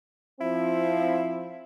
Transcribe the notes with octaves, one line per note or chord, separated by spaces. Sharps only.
F3 C4 E4